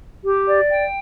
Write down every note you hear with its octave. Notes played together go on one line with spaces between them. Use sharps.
G4
D5
G5